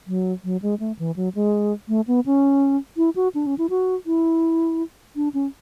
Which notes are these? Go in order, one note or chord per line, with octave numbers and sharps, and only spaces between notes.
F#3
F#3
G#3
A3
E3
F#3
G#3
A3
B3
C#4
E4
F#4
D4
C#4
E4
F#4
E4
D4
C#4